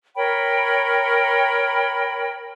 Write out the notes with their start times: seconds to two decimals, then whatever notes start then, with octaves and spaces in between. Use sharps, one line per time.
0.16 A#4 C#5 G5 B5